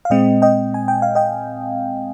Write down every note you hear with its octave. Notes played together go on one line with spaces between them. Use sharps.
F5
A#2 G#3 C4 D#5 G5
D#5 G5
G#5
G5
F5
D#5 G5